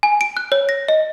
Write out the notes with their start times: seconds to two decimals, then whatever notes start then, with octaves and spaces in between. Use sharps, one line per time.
0.03 G#5
0.21 D7
0.37 F#6
0.52 C#5
0.69 A#6
0.89 D#5